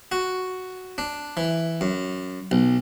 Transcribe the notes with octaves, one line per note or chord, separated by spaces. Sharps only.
F#4
D4
E3
F#2
B1